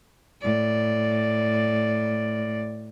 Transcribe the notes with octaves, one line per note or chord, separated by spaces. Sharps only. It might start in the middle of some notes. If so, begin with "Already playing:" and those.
A2 D5